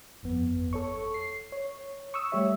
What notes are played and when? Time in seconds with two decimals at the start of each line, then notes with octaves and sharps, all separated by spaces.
0.23 G1 F2 B3
0.73 A4 C#5 C#6
1.14 C7
1.52 C#5
2.14 C#6 D#6 E6
2.32 G3 A3 G4 C#5 E5